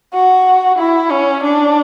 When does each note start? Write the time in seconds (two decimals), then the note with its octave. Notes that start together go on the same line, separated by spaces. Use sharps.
0.13 F#4
0.79 E4
1.11 C#4
1.44 D4